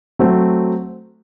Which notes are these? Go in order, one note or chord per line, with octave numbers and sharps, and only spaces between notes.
F#3 A3 C4